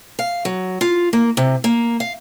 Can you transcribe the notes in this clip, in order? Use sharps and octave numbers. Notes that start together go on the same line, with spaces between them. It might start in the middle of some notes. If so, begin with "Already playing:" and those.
F5
F#3
F4
A#3
C3
A#3
F5